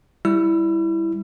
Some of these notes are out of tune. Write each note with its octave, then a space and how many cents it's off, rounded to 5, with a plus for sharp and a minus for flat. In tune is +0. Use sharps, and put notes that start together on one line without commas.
G3 +0 E4 +0 E6 +40